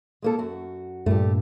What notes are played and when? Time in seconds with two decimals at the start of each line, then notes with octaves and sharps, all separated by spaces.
0.22 G#3 A#3 A4
0.39 F#2 F#4
1.06 G2 A#2 A3 G4